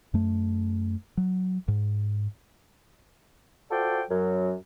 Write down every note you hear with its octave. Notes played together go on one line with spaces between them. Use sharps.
F#2 A3
F#3
G#2
F4 F#4 A4 C5 D5 G5
F#2 F#3